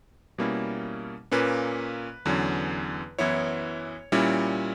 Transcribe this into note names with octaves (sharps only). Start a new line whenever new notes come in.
B2 G3 A#3 C#4 E4
A#2 A#3 C#4 B4
E2 D3 F#3 C#4
F#2 E3 B3 E4 C#5
A#2 G3 C#4 E4